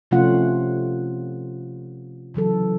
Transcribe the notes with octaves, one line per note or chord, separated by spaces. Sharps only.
C3 F3 A3 C#4 F4 F#5
C#3 E3 F#3 A4